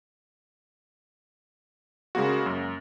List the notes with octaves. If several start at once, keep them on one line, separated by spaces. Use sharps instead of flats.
C#3 G#3 A#3 F#4
F#2